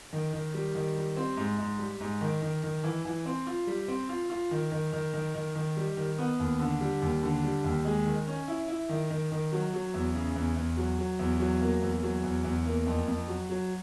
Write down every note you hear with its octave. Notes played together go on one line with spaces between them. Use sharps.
D#3
D#3
G3
D#3
G3
C4
G#2
G#2
G3
G#2
D#3
D#3
D#3
E3
E3
C4
F4
G3
C4
F4
F4
D#3
D#3
D#3
D#3
D#3
D#3
G3
D#3
B3
D#2
D3
G3
D#2
D3
G3
D#2
G#3
D#3
C#4
E4
E4
D#3
D#3
D#3
F#3
F#3
E2
C#3
E2
E2
F#3
F#3
E2
F#3
A#3
E2
F#3
E2
E2
A#3
F2
F2
F#3
F#3